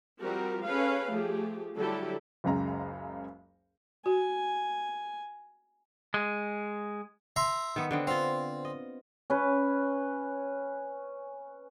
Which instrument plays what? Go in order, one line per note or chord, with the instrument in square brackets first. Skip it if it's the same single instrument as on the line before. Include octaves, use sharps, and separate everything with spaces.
[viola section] F3 G3 C4 F#4 G4 A#4
C#4 G#4 A4 B4 C#5 F5
F3 A3 G4 G#4
D3 F#3 G3 E4 G4 A4
[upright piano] F#1 C#2 F#2 C#3 A#5
[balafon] F#4 [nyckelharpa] G#5
[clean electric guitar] G#3
[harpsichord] E5 A#5 C6
[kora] D#3 B3
D3 B3 C4
[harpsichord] C4 [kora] F4 F5
[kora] D#5
[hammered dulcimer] C#4 B4